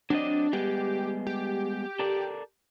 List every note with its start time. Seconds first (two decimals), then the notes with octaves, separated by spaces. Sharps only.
0.10 F#3 C4 D4 D#5
0.53 G3 G#3 B3 G4
1.27 G4
1.99 A4 A#4 D5